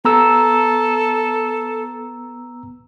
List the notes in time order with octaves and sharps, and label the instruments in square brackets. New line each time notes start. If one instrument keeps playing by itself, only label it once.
[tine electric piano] B3 A#5 E6 [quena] A4